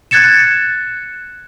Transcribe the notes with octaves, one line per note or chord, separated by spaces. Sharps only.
F#6 G#6 A6 C#7 E7